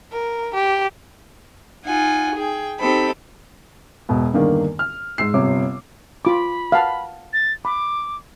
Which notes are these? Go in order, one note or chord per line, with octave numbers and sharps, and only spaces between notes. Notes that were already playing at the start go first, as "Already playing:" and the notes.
A#4
G4
D#4 F4 F#5 G#5
G#4 G5
C4 D#4 G4 A4 B5
E1 B2
E2 G2 D3 D#3 A#3 D4
F6
G#2 E6 C7
G1 C3 C#5 D6
F4 B5 D6
F5 F#5 A5
A6
B5 D6